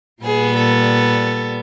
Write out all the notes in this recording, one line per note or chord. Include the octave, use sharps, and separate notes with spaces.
A#2 G3 B3 G#4
A4